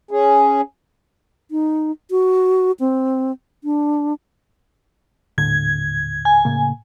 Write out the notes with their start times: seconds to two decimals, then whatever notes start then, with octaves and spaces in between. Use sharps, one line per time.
0.11 C#4 G#4
1.51 D#4
2.11 F#4
2.80 C4
3.64 D4
5.38 D#1 A2 D3 G#6
6.25 G#5
6.45 A2 C#3 A#3